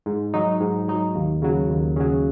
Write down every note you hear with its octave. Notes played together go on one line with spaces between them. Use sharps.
G#2
F#3 D#4
G#2
F#3 D#4
D#2
C#3 F#3
D#2
C#3 F#3